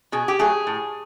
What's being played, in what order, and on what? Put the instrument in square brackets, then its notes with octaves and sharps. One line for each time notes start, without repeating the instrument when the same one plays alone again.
[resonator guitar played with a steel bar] B2 G#4
G4
F#3 A3 G#4
A2